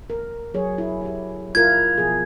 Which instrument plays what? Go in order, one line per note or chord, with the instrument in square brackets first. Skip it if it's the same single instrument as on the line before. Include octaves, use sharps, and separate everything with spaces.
[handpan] A#4
F#3 G#4 C#5
E4
E4 G4
[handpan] E4 F4 A#4 [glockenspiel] G#6
[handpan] B2 F3 G#4